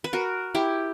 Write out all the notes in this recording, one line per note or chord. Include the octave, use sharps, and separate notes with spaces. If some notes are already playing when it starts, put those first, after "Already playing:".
B4
F#4 A#4
E4 G4